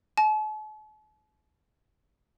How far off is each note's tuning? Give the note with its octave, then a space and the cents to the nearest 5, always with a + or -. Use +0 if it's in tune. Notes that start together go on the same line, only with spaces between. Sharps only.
A5 -45